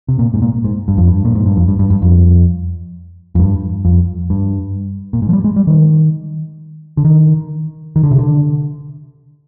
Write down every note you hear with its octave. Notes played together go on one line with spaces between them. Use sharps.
C3
A#2
G#2
A#2
G#2
G2
F2
G2
A#2
G#2
G2
F2
G2
G2
G2
F2
F2
G2
F2
G2
A#2
G#2
F3
G3
G#3
G3
D#3
D3
D#3
D#3
D3
C3
D3